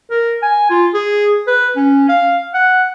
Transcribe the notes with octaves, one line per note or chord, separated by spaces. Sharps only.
A#4
G#5
F4
G#4
B4
C#4
F5
F#5